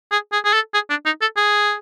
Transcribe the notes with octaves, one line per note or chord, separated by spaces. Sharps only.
G#4
G#4
G#4
A4
G#4
D4
D#4
A4
G#4